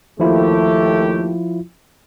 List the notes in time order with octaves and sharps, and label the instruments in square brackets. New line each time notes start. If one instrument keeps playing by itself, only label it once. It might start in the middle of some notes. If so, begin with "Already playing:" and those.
[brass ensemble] D#2 A3 G4 [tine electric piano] F3 E4 F4